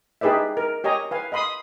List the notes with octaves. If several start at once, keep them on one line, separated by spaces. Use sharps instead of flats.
D#4 G4 G#4 B4 D5 E5
A#4
G4 C#5 D#5 G#5 A#5
B4 F5 G#5
D#5 F5 B5 C6 D#6